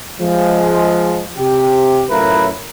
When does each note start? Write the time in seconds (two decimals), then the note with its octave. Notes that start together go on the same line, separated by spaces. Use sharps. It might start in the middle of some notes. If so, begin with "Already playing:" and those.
0.20 F3 G#3
1.38 C3 G4
2.10 F#2 A2 E4 F4 A#4 B4